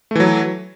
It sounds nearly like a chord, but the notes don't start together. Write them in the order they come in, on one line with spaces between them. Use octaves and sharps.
A3 E3 F#3